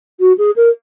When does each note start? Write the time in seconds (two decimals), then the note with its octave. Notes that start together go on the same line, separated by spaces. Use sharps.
0.20 F#4
0.38 G#4
0.56 A#4